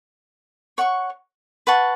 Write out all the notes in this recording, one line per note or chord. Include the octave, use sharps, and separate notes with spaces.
C#5 F#5 C#6
B4 F#5 A5 C#6